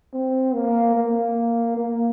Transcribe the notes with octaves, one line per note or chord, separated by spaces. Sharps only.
C4
A#3
A#3
A#3